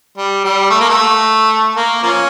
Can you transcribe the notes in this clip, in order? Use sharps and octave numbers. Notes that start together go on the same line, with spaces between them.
G3
G3
A3
A#3
A3
A#3
F3 A#3 C#4